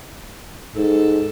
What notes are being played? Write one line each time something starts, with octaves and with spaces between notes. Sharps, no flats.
G#2 A4